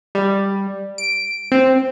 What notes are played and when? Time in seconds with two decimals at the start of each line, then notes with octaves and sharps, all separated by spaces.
0.15 G3
0.98 D7
1.52 C4